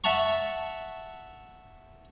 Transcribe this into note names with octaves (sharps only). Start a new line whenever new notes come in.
E5 F#5 A5 A#5 C#6